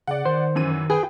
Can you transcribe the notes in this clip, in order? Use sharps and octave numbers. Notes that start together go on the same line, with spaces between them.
C#3 D5 F#5
D#3 C5
F#2 E3 D#7
G#4 B4 G5